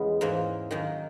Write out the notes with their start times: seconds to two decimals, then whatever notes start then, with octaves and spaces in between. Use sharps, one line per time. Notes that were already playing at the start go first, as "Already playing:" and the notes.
Already playing: E2 C#3 G#3 B3
0.21 G#2 E3 A#3
0.71 F#2 D#3 A#3